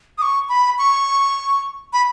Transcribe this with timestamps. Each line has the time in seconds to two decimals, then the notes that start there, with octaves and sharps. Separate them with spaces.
0.18 D#6
0.22 C#6
0.49 B5
0.79 C#6
1.93 B5